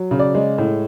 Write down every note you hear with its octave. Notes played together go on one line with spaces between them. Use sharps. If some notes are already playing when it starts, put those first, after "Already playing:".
Already playing: F#3
C#3
D5
G#3
A2